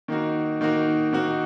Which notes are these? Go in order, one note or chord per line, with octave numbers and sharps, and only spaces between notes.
D#3 A#3 D#4 F#4
D#3 A#3 D#4 F#4
D#3 A#3 D#4 F#4